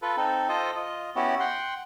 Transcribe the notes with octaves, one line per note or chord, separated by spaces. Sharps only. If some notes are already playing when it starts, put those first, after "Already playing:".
F4 A4 B4
C4 D#4 A4
F4 A4 C5 D#5
F4 D#5
B3 C#4 E4 F#4 G4
F#5 G5 C6